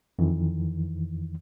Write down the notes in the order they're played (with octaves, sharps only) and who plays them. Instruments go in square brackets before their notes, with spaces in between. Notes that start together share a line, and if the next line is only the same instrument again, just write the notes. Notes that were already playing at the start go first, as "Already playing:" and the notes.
[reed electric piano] F2 D#3 E3